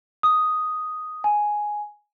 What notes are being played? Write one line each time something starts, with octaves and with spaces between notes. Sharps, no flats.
D#6
G#5